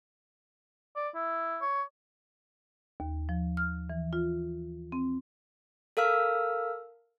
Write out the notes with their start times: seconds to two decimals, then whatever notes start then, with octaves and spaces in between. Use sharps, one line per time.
0.96 D5
1.15 E4
1.62 C#5
3.00 D#2
3.29 F3
3.57 F6
3.90 E3
4.13 F4
4.92 C4
5.97 A4 A#4 F5 E6 F6